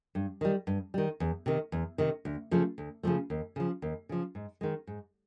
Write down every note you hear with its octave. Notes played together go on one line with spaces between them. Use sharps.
G2
D#3 G3
G2
D#3 G3
E2
C3 D#3
E2
C3 D#3
D2
C#3 F3 A3
D2
C#3 F3 A3
D#2
C#3 F3
D#2
C#3 F3
G#2
D#3 G#3
G#2